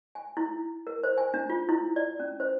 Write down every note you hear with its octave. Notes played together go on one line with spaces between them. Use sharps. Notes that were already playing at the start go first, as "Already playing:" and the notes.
G#5
E4
A#4
C5
G#5
D4
F4
E4
D5
C#4
C5